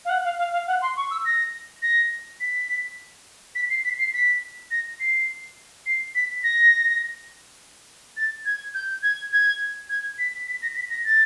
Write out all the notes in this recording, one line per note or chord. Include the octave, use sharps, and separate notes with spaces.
F5
F#5
F5
F5
F5
F#5
C6
C#6
E6
A#6
A#6
B6
B6
C7
B6
C7
B6
A#6
C7
C7
B6
A#6
A6
G#6
G6
G#6
G#6
G#6
B6
B6
A#6
B6
A#6
A6